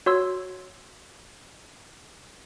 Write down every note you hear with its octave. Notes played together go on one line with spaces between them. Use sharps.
F#4 C#5 C6 E6